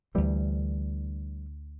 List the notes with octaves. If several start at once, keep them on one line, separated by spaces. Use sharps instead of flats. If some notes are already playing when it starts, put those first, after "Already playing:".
D2 D3 E3 G3